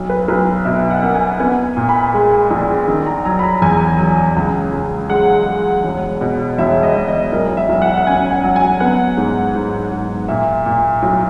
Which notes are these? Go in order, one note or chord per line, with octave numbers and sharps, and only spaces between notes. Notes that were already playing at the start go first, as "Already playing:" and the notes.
Already playing: B1
B4
B1 B4
B2 E5
F#5
A#3
G#5
B3 G#5
A#2
B5
G#3
A#1
D#3
A#5
F#3 A#5
B5
A#5
E2 G#5
F#3
C#2
C#2
G#3 F#5
G#3
E1
B2
E1 E5
D#5
E1
D#5
B1 A#4
E5
B1
F#5
E5
F#5
C#4 G#5
F#5
F#3
G#5
B3 F#5
G#2
G#2
G#2
A#2 E5
A#2
B1